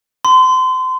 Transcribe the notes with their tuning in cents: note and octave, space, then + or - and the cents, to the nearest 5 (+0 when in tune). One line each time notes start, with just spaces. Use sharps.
C6 -30